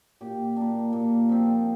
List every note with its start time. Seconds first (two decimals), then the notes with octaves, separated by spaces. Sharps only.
0.21 A#2 G4
0.56 A#3 D4
0.93 A#2
1.29 F3 C4